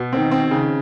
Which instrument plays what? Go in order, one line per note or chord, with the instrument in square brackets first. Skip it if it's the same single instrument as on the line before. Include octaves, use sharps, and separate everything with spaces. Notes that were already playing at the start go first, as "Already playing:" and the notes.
Already playing: [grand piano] B2
[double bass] D#3 [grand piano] C4
[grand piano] C4
C#3